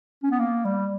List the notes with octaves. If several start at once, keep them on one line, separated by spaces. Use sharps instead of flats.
C#4
B3
A#3
G3